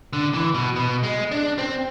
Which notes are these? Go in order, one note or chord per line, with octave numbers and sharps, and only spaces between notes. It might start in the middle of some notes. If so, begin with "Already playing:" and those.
D3
E3
B2
B2
G#3
D4
C4